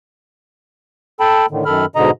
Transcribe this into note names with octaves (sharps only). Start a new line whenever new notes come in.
A4 G5 A5 B5
A2 D3 D#3
F#2 D#3 A4 B5 F6
G#2 B2 D3 D#5 A#5